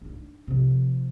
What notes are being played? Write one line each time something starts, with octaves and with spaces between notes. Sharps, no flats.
D4 D#4
C3 F3